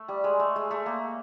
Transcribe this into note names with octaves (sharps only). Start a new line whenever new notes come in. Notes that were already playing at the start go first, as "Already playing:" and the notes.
Already playing: A3
G3
G#3
A3
G#3
A3
A#3